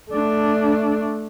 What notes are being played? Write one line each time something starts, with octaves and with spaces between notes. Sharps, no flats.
A3 D4